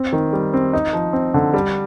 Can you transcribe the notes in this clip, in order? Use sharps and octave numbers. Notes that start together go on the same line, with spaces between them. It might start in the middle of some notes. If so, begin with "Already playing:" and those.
Already playing: C4
D#3
G3
C4
D#4
F3
C4
D3
G3